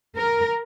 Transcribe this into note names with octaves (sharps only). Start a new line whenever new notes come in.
A#4